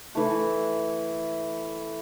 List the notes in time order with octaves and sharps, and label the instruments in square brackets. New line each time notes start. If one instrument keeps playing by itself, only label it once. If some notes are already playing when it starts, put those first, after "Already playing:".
[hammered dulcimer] E3 A3